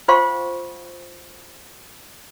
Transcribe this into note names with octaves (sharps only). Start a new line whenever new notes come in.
F4 C5 F5 G5 C6 C#6